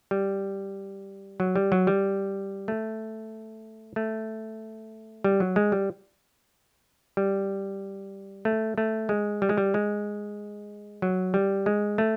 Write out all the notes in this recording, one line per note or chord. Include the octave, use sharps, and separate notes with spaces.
G3
F#3
G3
F#3
G3
A3
A3
G3
F#3
G#3
G3
G3
A3
A3
G#3
G3
G#3
G3
G#3
F#3
G3
G#3
A3